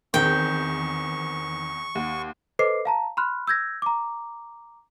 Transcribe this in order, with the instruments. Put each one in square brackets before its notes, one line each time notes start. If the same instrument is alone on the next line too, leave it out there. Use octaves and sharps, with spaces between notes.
[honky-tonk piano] E2 [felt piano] D#3 C4 A#4 [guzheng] G5 [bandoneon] C#6
[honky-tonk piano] D#2 [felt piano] F#5
[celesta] A4 B4 C5 D#5 D6 C7
F5 A5 A#5
B5 C6 F6 F#6
E6 G6 G#6 A#6
A#5 D6